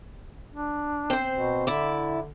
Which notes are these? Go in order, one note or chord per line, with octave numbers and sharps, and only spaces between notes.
D4
C4 C5
B2
D3 E4 D5